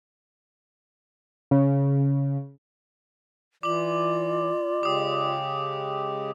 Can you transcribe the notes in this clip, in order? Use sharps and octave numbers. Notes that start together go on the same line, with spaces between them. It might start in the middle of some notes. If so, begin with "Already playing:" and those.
C#3
E3 F4 D5 D6 F#7
C#3 G#3 G4 D6 D#6